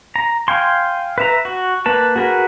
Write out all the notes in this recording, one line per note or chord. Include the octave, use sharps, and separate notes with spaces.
A#5
F5 G5 G#5 C6
B4 E5 A#5
F#4
A#3 B4 A5
F#4 G#4 A#4 B4 F#5